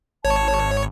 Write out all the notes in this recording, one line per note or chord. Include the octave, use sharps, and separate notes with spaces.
G#1 C#5 A5